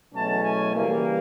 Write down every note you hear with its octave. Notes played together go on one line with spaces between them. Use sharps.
E2 B2 F#3 A3 C#4 A5
G#5
C#3 E3 G3 A#3